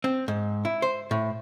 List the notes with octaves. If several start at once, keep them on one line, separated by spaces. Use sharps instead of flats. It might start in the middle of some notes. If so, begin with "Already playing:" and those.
C4
G#2
E4
C5
A2